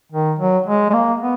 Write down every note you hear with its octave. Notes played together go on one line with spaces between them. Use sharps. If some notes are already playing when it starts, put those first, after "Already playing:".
D#3
F#3
G#3
G#3
A#3
B3